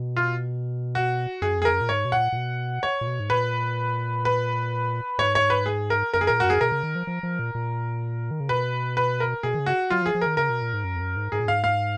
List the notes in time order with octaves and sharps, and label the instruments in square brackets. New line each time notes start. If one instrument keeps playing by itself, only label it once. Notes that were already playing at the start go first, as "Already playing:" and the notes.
Already playing: [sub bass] B2
[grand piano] F4
F#4
[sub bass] F#2 [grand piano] G#4
[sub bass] F2 [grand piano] G#4
[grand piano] A#4
[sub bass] F#2
A#2
[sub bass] G#2 [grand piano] C#5
[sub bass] B2
[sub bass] A#2 [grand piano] F#5
[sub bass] A#2
B2
[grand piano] C#5
[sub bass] A#2
B2
G#2
[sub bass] A#2 [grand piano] B4
[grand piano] B4
[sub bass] G#2 [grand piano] C#5
[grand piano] C#5
B4
G#4
A#4
[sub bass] F#2 [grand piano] A#4
[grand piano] G#4
[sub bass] A#2 [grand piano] A#4
[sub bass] F#2 [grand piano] F#4
[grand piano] G#4
[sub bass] B2 [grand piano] A#4
[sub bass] C#3
D#3
F3
F3
F3
A#2
A#2
D#3
C#3
[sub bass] B2 [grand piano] B4
[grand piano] B4
A#4
[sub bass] B2 [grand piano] G#4
[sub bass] D#3
C#3
[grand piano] F#4
[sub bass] F#3 [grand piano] F4
[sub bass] F3 [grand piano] G#4
[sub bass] F3
[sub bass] D#3 [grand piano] A#4
[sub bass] C#3 [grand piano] A#4
[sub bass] B2
A#2
G#2
F#2
F2
F#2
G#2
[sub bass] G#2 [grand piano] G#4
[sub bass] A#2
[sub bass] G#2 [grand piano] F5
[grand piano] F5